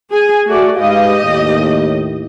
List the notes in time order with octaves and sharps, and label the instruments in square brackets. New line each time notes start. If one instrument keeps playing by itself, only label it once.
[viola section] G#4 G#5
[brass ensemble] A3 [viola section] F#4 D5
[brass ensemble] G#2 B4 F5 [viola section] G4 D#5
[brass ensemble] D#2 A2